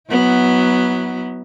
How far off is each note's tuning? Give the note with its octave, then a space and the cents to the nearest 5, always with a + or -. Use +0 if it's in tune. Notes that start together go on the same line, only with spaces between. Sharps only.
F#3 +0 B3 +0 E4 -40